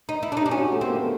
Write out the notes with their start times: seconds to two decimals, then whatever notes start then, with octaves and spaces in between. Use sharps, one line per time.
0.09 D#4
0.23 E4
0.32 D4
0.37 D#4
0.41 G4
0.46 D4
0.51 C#4 F#4
0.72 A3
0.81 C4
0.85 A#3
0.97 B3